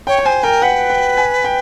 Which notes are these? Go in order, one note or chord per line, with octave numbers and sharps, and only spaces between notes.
C#5 G5
G5
C5 G#5
A#4 G5
B4 F#5
G5
G#5
G5